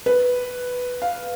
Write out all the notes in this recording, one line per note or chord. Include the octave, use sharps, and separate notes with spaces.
B4
F5